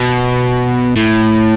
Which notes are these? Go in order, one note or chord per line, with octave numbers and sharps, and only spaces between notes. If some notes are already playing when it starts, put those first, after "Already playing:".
Already playing: B2
A2